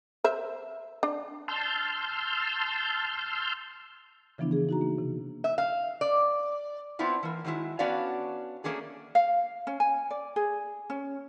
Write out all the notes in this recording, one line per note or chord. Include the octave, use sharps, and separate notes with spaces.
A#4 C5 E5
D4
A5 C6 E6 F6 G6
C#3 E3 F3 B3 D4 E4
D4 G#4
D#4 F#4 A#5
A#3
C3
E5
F5
D5
B3 C4 D4 E4 F4
E3 A#3
D#3 F#3 G#3 C#4 E4
B3 C#4 D4 F#4 D5 F5
A3 A#3 C#4 D4 G#4
F5
C#4
G#5
D5
G#4
C#4